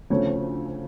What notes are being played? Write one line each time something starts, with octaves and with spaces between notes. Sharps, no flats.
D2 C#3 F3 A3 C4 C#5